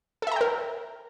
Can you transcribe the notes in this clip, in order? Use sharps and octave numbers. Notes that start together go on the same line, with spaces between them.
A4 A#4 E5 G5 A#5